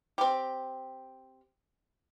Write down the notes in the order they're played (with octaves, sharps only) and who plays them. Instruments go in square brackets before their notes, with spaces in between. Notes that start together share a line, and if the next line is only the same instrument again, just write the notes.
[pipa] C4 G4